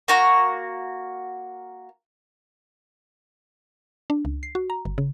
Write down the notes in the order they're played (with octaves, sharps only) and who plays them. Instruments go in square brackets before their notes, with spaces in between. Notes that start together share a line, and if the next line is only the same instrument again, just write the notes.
[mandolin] A#3 F#4 A#5
[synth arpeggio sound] D4
C#2
C7
F#4
A#5
G1
C#3